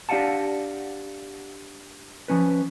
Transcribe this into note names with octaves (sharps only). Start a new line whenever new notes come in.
D4 G4 D5 F5 F#5 A5
F3 C#4 B4